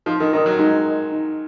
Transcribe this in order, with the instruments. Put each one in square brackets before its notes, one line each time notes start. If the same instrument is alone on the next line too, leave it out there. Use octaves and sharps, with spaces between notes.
[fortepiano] F3 [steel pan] D#4
[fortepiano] D#3
[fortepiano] D#3 [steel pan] A#4 D#5
[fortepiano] F#3
[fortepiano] G#3 [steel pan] D#4
[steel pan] A#4 D#5
D#4